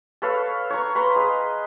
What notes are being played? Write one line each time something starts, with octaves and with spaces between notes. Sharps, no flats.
A4 B4 C#5 F5
C#5 A#5 C#6
B4 A#5 C6
G#4 D#5